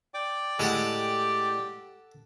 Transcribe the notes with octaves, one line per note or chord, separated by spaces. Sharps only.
D5 G5 D6
A2 G#3 G4 A4 F#5 A5